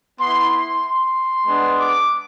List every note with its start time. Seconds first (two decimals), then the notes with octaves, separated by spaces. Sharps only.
0.19 B3 E4 C6
0.52 C6
0.84 C6
1.47 G#3 B3 D4
1.78 D6